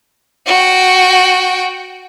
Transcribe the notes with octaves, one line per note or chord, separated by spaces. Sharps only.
F#4 G5